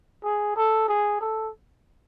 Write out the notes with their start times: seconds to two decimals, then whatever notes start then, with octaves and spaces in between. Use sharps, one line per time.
0.24 G#4
0.56 A4
0.88 G#4
1.21 A4